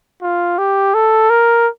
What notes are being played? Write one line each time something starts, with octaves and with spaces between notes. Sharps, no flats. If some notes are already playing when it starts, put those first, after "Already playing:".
F4
G4
A4
A#4